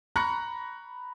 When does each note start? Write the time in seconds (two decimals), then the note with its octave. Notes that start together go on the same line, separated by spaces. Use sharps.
0.16 A#5 B5 C#6 F#6 A#6 C#7